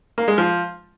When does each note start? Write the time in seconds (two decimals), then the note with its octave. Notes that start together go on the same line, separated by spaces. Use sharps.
0.18 A#3
0.28 G#3
0.38 F3